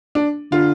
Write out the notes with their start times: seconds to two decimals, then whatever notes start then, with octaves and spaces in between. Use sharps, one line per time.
0.15 D4
0.52 D3 F4